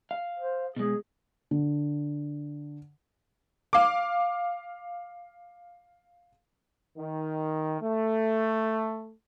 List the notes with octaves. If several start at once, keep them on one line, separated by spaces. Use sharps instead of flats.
F5
C5
B2 G#3 G#4
D3
F5 D6
D#3
A3